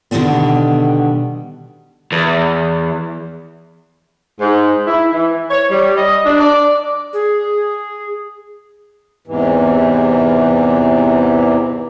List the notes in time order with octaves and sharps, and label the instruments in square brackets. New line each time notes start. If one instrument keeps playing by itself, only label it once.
[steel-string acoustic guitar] B2 D3 D#3 G3 A3 B3
[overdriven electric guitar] E2
[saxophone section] G#2
E4
E3
C#5
G3
D#5
D4
D5
[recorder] G#4
[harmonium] E2 G#2 C3 E3